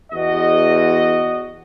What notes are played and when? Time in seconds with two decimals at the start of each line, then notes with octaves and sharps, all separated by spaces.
0.13 E2 F#4 D#5